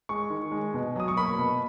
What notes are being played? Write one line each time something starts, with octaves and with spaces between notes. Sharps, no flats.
G#3 C#6
D#3
G#3
B2
F#3 D#6
C#6
A#3 B5
B2